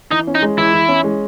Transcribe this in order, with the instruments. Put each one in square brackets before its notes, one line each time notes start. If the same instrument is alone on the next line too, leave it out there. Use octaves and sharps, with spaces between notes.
[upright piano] E3 [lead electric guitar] D#4
[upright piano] C#4
[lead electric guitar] D#4
[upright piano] G#3
[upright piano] E3 [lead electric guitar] E4
[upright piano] E3
C#4
G#3